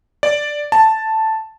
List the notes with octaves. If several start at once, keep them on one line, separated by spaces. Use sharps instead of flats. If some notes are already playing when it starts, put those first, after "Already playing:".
D5
A5